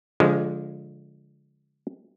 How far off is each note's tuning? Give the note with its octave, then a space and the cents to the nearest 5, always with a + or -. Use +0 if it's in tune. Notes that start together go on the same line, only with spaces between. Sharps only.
D3 -30 F3 +0 G#3 +0